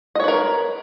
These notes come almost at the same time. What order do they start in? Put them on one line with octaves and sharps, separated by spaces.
D#5 C#5 B4 A#4